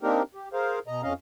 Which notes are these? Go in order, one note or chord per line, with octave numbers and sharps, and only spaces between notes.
A#3 C4 D4 D#4 G4 A#4
G4
G#4 A#4 C5 F5
B2 D#5 A#5
F2 C#4 D#5 F5